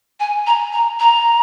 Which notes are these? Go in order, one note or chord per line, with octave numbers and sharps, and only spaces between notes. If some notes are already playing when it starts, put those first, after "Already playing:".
G#5
A#5
A#5
A#5